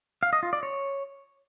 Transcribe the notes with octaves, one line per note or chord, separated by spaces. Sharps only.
F5
D#5
F4
D5
C#5